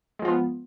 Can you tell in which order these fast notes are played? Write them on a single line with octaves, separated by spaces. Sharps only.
G#3 F3 F4 B3